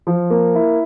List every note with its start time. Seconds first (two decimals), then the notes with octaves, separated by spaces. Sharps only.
0.07 F3
0.30 A#3
0.55 E4